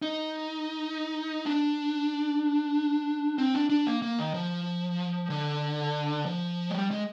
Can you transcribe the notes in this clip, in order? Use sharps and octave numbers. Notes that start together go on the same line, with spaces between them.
D#4
D4
C4
D4
D4
A#3
A#3
D#3
F3
D3
F3
G#3
G3
G#3